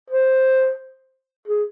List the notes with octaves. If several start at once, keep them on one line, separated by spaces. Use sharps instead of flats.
C5
G#4